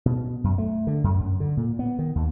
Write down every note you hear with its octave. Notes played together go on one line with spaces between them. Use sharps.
B2
F#2
A3
D3
F#2
F#2
D3
A#2
B3
D#3
D#2